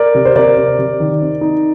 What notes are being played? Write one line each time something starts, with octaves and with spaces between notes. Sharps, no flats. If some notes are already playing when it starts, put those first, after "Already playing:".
Already playing: A#4 D5
C3
C5
C3 A#4 D5
C3
C3
D#3
C4
D#4